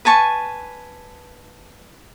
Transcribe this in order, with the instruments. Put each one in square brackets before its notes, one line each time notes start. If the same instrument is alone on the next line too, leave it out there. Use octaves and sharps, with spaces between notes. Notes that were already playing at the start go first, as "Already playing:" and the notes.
[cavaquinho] B4 G#5 A5 C#6